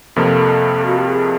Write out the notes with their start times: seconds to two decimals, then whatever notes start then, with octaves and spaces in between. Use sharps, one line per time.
0.16 F2 C3 F3 A#3 A4
0.85 F#4
0.97 G4
1.08 G#4